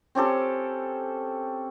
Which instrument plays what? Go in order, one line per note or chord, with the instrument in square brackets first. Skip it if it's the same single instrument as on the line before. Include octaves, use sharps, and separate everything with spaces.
[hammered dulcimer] C4 C#4 G4 A4